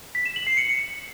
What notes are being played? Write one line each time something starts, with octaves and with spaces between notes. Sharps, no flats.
B6
E7
F#7
C7
C#7